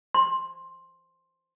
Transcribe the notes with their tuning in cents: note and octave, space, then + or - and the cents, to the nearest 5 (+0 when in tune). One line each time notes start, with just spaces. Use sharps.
C6 +10